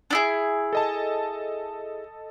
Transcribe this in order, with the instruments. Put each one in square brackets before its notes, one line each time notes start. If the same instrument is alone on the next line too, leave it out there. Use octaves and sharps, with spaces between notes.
[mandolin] D4 E4 G#4
[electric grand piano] A4 D#5 A5